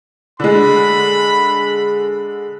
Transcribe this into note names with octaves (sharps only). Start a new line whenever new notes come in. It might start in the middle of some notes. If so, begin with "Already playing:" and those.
D3 G#3 B5